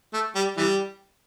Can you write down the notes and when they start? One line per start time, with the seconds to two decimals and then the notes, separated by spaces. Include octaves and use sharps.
0.13 A3
0.35 G3
0.57 E3 G3